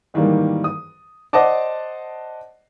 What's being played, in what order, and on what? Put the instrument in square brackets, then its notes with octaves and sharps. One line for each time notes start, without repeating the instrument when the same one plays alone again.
[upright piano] G#2 D#3 E3 G3 A#3
D#6
C5 D5 D#5 F#5 A5 D6